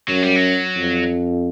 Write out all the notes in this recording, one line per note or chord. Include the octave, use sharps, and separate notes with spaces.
F#2 F#3
G3
F#3
F2